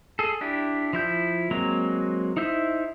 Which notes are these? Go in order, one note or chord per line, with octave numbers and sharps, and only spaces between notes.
G#4 A4
D4 E4 G4
F3 E4 G6
F#3 G#3 A#3 C4 A#5
D#4 E4 C5 E5